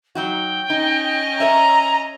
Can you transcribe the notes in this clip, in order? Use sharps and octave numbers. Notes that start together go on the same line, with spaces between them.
F#3 D#4 F#4 G5
C#4 D#4 D#5
A#4 C#5 E5 A#5